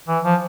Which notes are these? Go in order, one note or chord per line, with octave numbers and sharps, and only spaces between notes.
E3
F3